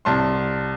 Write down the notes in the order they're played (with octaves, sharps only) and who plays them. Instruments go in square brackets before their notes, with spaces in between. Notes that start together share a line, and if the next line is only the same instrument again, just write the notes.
[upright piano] C2 A5 C6